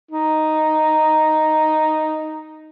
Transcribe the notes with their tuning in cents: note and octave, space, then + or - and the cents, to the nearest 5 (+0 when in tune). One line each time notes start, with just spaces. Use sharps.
D#4 +0